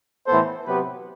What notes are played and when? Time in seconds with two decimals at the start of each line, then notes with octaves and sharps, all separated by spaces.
0.27 A2 E3 B3 A4 C5
0.66 C3 F#3 B3 G4 B4